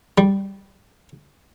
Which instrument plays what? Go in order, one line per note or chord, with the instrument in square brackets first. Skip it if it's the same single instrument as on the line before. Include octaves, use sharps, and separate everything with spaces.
[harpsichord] G3